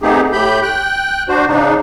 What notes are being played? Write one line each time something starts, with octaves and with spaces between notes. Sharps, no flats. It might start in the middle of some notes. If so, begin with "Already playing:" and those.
A3 B3 C4 D#4 G4 G#4
A2 A3 G4 B5 G6
G5 F#6
D4 F#4 C5
G#2 C#3 D4 D#4